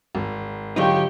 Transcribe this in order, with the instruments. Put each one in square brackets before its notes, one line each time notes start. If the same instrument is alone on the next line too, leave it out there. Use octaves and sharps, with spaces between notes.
[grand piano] G#1
[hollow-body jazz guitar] D3 F#3 D#4 [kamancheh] F4 C#6 [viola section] G4 G5